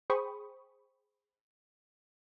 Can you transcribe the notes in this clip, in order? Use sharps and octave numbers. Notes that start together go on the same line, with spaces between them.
G#4 C5 G5 B5 C#6 D#6